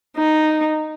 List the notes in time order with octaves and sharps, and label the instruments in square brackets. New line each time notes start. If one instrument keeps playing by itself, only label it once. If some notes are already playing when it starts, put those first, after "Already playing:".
[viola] D#4